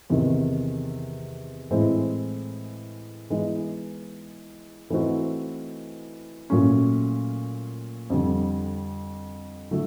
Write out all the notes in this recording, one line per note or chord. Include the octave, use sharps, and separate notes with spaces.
E2 C3 D#3
A2 E3 G#3 C4
E3 G#3 B3 D#4
E3 A3 C4 D#4 F#4
A#2 F#3 A3 C#4
F2 D3 G3
D3 F#3 A3